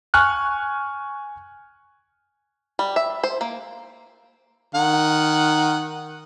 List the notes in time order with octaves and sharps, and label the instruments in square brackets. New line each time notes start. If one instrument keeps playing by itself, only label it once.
[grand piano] G#5 C#6 F6 F#6
[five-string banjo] G3
E5
C5
A#3
[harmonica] D#3 F#5